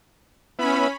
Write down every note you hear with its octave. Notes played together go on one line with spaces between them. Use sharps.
B3 C#4 E4 B5